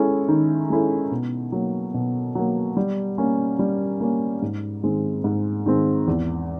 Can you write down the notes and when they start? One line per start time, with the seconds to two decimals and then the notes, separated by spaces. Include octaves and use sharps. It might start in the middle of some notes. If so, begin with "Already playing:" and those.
Already playing: G#3 C#4 E4 A4
0.28 D#3
0.70 G#3 C#4 E4 A4
1.11 B2
1.52 F#3 A#3
1.94 B2
2.35 F#3 A#3
2.77 G3
3.18 A#3 C#4
3.59 G3
4.00 A#3 C#4
4.42 G#2
4.83 D#3 G#3 C4
5.24 G#2
5.66 D#3 G#3 C4
6.07 E2